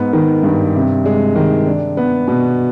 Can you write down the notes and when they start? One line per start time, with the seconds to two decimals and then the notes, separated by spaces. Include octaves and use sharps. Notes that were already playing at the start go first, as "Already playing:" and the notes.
Already playing: G#2 B3
0.13 D#3
0.43 G2
0.75 C3
1.05 G#3
1.36 D#3
1.67 D4
1.97 B3
2.28 B2